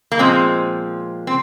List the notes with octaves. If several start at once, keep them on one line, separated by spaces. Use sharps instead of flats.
A#3
A#2 F3 G#3 C4
C4